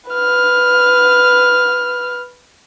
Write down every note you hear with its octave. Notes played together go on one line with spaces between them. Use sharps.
B4 F6